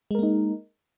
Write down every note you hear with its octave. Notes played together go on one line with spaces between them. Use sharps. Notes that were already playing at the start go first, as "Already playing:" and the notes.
G#3 A#3 D#4 A#4